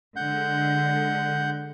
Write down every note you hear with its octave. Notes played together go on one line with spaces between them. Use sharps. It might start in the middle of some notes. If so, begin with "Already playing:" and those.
D3 G#3 F#5 G6